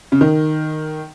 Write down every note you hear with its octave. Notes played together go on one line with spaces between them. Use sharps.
C#3
D#3